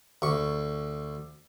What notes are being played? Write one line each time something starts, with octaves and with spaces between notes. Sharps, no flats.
D2 C#6